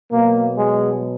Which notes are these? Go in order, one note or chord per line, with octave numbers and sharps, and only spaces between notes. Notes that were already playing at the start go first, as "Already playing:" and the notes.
B2 F#3 A#3
G#3